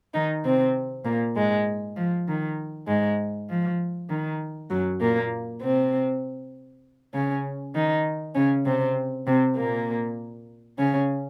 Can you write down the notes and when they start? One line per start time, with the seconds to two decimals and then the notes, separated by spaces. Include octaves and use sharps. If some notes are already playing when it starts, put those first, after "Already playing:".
0.14 D#3 D#4
0.44 C3 C4
1.05 A#2 A#3
1.36 G#2 G#3
1.96 F3
2.27 D#3
2.87 G#2 G#3
3.49 F3
4.10 D#3
4.70 F#2 F#3
5.01 A#2 A#3
5.62 C3 C4
7.14 C#3 C#4
7.75 D#3 D#4
8.35 C#3 C#4
8.65 C3 C4
9.27 C3 C4
9.57 A#2 A#3
10.79 C#3 C#4